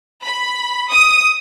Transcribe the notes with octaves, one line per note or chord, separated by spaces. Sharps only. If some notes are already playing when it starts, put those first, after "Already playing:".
B5
D#6